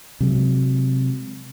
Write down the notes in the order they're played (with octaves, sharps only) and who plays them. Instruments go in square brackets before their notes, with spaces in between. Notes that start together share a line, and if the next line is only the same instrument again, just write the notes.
[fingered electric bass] C3 F#3 G#3